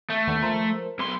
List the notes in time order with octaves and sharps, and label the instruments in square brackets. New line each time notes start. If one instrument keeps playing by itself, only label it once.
[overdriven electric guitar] A3
[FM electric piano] D#2 B3 D4
F3 A#4 C5
[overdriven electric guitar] B1 C6